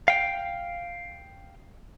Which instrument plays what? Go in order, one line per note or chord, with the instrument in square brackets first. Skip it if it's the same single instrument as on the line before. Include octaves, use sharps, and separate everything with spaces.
[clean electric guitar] F5 G5